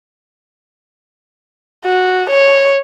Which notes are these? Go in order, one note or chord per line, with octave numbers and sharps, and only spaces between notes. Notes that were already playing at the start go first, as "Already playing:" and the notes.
F#4
C#5